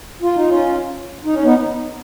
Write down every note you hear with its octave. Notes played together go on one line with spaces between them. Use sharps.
F4
D#4
C#4 F4
D#4
C#4
B3 D#4